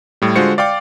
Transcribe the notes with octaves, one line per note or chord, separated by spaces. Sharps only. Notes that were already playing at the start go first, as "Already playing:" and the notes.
A2 G3
D3 G#3 F4 F#4 C5 C#7
D5 F5 G5 D6